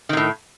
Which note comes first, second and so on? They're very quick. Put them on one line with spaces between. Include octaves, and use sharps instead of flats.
D#3 C3 A2